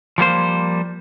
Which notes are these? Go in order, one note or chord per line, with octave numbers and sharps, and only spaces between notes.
F3 G3 A#3 C5